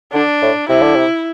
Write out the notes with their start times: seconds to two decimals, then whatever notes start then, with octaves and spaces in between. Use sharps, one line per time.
0.13 D3 D4
0.42 A2
0.69 C3 E4
0.81 D3
0.95 C3